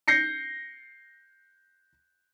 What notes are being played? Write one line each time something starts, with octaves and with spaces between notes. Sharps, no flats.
G6 A#6 C7 C#7